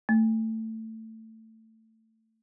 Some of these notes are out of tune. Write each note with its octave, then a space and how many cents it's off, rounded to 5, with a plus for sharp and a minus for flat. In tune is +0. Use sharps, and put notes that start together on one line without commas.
A3 +20